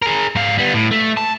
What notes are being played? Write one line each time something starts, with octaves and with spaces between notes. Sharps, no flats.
G#4 A#4
G#2 F5
G3 B3
A2
A3
A5